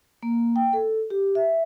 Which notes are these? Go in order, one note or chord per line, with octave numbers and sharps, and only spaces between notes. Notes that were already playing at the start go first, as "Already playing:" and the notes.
A#3
G5
A4
G4
E5